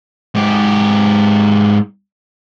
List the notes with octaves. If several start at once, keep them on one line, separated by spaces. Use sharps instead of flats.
G#2 G4